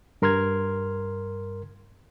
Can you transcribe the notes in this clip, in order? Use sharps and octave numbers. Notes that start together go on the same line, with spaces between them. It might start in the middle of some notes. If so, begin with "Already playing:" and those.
G2 A#4 C6 F6 G#6